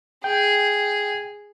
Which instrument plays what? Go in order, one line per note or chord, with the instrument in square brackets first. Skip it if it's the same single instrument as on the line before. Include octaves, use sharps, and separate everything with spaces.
[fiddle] G#4 [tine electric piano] G5